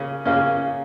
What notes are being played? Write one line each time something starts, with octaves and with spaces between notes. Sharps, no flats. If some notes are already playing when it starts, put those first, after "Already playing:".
Already playing: C#3 A#3 C#4
C#3 A#3 C#4